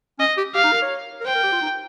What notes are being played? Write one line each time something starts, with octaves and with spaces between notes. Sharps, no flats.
C#4 D#5
G4
G4 F5
D#4
A#4
C#5
A#4
C5 G5
A#4
G4
F4
D#4